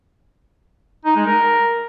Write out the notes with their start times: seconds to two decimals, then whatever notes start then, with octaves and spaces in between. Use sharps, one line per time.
1.05 D#4
1.16 G#3
1.26 A#4